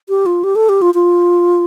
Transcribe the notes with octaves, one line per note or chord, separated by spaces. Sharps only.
G4
F4
G4
A4
G4
F4
F4